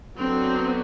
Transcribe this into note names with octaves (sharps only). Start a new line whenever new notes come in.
D3 F#3 B3 C4 F#4